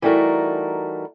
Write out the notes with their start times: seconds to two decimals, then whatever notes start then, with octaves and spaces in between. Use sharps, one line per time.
0.02 E3 G3 A3 D#4 F#4 A#4